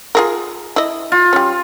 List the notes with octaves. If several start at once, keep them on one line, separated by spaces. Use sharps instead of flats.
F4 G#4 A#4
E4 D#5
F4
G3 C#4